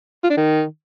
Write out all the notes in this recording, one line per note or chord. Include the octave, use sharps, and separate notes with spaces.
F4
D4
D#3